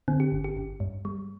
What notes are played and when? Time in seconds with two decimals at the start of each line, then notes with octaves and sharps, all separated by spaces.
0.08 D3 C4
0.20 G4
0.32 G1
0.44 G4
0.57 G1
0.80 G2
1.05 G3